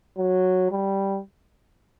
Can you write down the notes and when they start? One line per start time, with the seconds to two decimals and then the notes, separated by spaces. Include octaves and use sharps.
0.18 F#3
0.71 G3